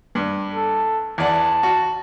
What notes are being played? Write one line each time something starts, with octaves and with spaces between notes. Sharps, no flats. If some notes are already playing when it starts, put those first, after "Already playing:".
G2
A4
E2 D5 F#5 A5
F#4